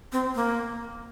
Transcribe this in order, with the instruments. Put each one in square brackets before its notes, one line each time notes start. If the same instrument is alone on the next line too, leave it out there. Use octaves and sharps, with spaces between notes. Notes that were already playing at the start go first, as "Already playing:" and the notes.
[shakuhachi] C4
A#3